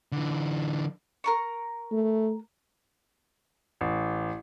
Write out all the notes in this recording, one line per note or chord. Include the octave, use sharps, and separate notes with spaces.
D3 E3
A#4 A#5 C#6
A3
A1